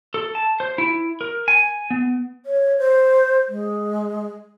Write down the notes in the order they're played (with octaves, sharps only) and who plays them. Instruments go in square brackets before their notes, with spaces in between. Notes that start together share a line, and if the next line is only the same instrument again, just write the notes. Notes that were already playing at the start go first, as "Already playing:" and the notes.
[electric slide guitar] A4
A5
C5
E4
A#4
G#5
B3
[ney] C#5
C5
G#3